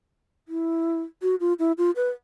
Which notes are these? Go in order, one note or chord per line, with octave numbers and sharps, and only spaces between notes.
E4
F#4
F4
E4
F4
B4